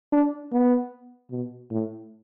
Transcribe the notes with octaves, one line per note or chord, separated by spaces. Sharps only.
D4
B3
B2
A2